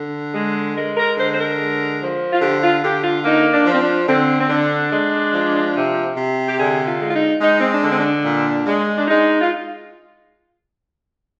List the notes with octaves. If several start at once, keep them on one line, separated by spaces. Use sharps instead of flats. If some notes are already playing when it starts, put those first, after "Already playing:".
Already playing: D3
G#3
G#3 A#4
A#4
D3 C5
C5
A#4
G#3
F3
F4
D3 G4
F4
D3 G4
F4
A#3 D#4
D4
F3
C4
D4
D3 C4
C4
D3 D4
G#3
F3
C3
C3
G4
D3 G#4
F4
G#3
F4
D#4
G#3 D#4
C4
D4
D3
C4
D4
A#2
G#3
D4
G#3 D#4
F4